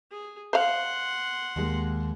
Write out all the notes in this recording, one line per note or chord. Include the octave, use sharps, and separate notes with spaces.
G#4
C5 F5 F#5 C6
D#2 G#3